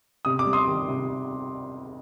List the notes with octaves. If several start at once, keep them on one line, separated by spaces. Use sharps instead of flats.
C3 D#6
D6
G3
C6 D#6
D#3
C3